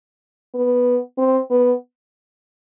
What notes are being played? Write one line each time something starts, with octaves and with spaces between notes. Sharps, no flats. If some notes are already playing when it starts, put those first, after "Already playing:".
B3
C4
B3